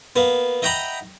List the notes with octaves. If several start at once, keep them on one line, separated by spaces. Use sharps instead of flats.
A#3 B3
D#5 E5 F#5 G5 A#5 B5